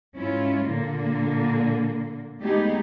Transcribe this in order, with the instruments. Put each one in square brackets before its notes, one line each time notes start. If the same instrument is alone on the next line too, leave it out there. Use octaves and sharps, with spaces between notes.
[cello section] G#2 C#4 E4 F4
A#2 D3 A#3
G#3 A3 B3 D#4 G4 G#4